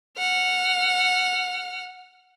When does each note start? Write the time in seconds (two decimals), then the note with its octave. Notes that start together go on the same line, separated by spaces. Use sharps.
0.18 F#5 F6